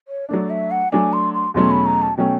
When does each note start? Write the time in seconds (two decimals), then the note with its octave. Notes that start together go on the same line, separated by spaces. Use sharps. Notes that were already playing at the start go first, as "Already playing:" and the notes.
0.08 C#5
0.29 F#3 A3 D4 D5
0.50 E5
0.71 F#5
0.92 F#3 A3 D4 G#5
1.13 C6
1.34 C6
1.54 E2 B2 F#3 A3 C#4 C6
1.71 B5
1.86 A#5
2.02 A5
2.17 B2 F#3 A3 C#4 G5